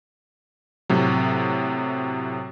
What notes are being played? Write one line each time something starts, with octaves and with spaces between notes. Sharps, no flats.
A2 C3 F#3